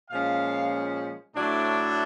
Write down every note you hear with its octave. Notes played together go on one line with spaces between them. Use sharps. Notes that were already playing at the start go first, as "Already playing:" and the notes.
A#2 F3 G#3 C#4 F5
A2 F#3 A3 D4